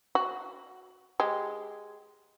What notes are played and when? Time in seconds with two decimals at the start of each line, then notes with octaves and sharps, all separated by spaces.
0.15 F#4
1.20 G#3 G4